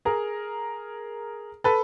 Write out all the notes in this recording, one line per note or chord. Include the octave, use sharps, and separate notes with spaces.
G#4 A#4
A4 B4